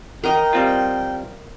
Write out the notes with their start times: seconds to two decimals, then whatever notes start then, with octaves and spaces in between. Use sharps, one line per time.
0.24 A#4 D#5 G5
0.53 G3 C4 F4